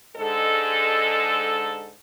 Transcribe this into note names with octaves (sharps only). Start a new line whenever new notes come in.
G#2 D3 G#3 A4